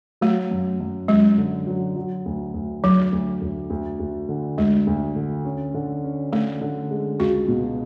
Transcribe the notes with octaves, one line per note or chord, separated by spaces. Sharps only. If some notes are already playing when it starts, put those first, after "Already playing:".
F#3 A3
F#2
F#2
F#2 G#3
D3
F#3
F#3
D2
D2
D2 F#3
D2
D2
D2
D2
D3
D2 G#3
D2
D3
C#4
D3
C#4
D3 A3
D3
G#3
C#2 F#4
B2